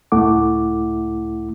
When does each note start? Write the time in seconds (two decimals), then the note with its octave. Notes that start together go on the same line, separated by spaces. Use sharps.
0.12 C#2 A2 A3 E4 F#5 D6